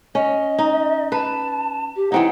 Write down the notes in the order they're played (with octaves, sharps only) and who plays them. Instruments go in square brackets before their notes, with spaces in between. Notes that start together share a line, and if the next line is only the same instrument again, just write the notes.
[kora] C#4 [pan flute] D#5
[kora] D#4
[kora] B4 [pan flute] A5
[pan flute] G4
[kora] E3 C4 D#4 [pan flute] F#5